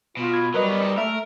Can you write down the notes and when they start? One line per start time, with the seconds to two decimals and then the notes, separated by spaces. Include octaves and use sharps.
0.17 B2 F4
0.34 G#6
0.54 F#3 G3 A#4 B4 D#5
0.68 B3 C#4
0.82 D#4 A4
0.98 A3 A#4 E5